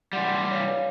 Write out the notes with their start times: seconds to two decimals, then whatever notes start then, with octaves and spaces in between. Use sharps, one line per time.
0.13 E3 G3 F#5 C6
0.51 C#5 F5